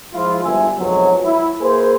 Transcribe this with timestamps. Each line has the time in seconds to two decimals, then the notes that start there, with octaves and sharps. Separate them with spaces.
0.14 F3 G#3 E4 F4
0.44 G1 E5 G#5
0.79 F2 G#2 B2 F#3
1.25 E4
1.61 A#3 G#4 B4 C5